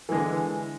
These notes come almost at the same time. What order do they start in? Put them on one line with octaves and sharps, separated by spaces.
E3 G#3 D3